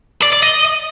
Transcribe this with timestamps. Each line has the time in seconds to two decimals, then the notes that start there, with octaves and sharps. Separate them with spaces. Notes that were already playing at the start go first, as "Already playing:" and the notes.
0.22 D5
0.32 D5
0.43 D#5